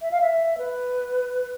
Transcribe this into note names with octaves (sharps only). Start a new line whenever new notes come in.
E5
F5
E5
B4